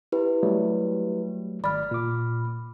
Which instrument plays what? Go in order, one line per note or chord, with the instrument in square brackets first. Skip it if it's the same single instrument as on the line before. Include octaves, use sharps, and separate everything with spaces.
[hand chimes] E4 G4 B4
[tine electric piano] F#3 G3 A3
[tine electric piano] G#1 D5 [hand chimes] B5 F6
[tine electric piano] A#2 D6